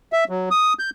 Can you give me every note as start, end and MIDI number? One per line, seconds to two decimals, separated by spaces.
0.13 0.24 76
0.29 0.49 54
0.51 0.73 87
0.79 0.90 91